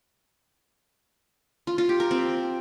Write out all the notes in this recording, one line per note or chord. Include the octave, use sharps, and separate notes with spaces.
F4
F4
G4
A#4
C4